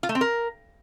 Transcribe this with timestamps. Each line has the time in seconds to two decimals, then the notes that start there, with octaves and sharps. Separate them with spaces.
0.03 F4
0.09 A3
0.15 C4
0.21 A#4